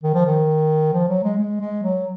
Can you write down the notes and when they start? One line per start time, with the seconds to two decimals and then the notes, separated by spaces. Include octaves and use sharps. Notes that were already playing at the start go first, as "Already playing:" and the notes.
0.04 D#3
0.14 F3
0.26 D#3
0.93 F3
1.08 F#3
1.23 G#3
1.38 G#3
1.61 G#3
1.83 F#3